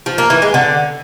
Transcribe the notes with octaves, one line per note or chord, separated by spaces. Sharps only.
F3
A#3
E3
G#3
D3